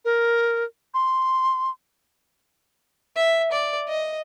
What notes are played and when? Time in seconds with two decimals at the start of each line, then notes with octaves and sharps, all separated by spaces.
0.05 A#4
0.94 C6
3.16 E5
3.52 D5
3.89 D#5